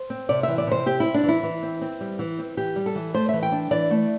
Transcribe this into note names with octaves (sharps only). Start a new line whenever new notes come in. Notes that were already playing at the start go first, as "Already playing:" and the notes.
Already playing: C5
C4
C3 D5
E3 E5
D5
C3 C5
C4 G4
E4
C4
D4
E3 E4
E3
C4
C4
G3
E3
C4
E3 G4
G3
A4
E3
A3 C5
E3 E5
G5
D4
E3 D5
A3